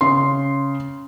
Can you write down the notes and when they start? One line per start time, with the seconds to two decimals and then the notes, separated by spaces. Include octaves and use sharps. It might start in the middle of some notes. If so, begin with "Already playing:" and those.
0.01 C#3 C6